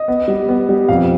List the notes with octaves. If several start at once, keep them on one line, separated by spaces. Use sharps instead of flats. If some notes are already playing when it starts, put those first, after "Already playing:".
Already playing: D#5
B3
G3
B3
G3
F2 F5